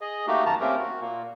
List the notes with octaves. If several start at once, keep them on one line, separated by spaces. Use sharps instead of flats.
G#4 D#5
A3 A#3 D#4 F#4 G4
F#2 D#3 A5 A#5
A3 A#3 C4 C#4 G4 A#4
F#4
A#2 A#3